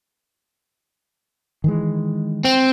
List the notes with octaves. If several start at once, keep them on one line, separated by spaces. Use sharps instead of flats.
D#3 E3 G#3
C4